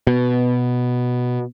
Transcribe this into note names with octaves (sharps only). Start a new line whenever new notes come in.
B2